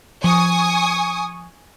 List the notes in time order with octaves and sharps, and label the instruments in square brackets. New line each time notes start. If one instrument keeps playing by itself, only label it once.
[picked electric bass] F3 [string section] G#5 C#6 D#6